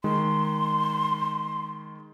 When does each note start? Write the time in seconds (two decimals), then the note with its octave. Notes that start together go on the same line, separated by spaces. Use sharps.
0.04 D#3 G#3 C6